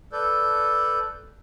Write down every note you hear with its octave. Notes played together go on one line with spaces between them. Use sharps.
A4 B4 D5 G6